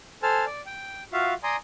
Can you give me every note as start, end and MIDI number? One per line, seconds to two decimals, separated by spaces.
0.23 0.45 69
0.23 0.45 72
0.23 0.45 80
0.23 0.45 81
0.23 0.45 89
0.46 0.61 74
0.66 1.03 79
1.13 1.34 65
1.13 1.34 66
1.13 1.34 76
1.13 1.34 77
1.43 1.56 74
1.43 1.56 80
1.43 1.56 82
1.43 1.56 84
1.43 1.56 87